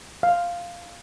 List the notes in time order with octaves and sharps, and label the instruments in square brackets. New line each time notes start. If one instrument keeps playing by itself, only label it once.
[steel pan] F5